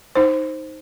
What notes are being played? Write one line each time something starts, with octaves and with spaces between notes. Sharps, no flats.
D#4 C5